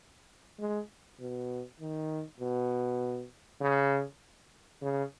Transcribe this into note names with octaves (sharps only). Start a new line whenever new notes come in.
G#3
B2
D#3
B2
C#3
C#3